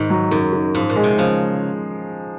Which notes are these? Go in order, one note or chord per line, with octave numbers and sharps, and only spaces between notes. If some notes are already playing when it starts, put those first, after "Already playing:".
Already playing: G#2 D#3
F#3
F#2 D#3
D#3
G#2 F3
A#2
G#3
C3
C#3 F3